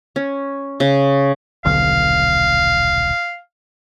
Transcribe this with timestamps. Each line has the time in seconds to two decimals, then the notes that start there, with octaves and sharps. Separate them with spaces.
0.16 C#4
0.80 C#3
1.65 D#1 B1 D3 F5